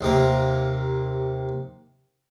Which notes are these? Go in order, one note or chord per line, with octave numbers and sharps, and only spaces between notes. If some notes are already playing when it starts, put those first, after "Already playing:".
D#2 C3 A#3